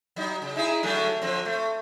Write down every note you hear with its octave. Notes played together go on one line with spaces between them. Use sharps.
F#3 D#4
C#3
D#4 E4 G#4
D3 F#3 A3
D3 F3 C4
A3